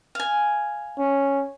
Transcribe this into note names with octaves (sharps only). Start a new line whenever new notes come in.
F5 G#5
C#4